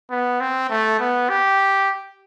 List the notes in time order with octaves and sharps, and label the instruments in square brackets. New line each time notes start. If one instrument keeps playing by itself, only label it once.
[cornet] B3
C4
A3
B3
G4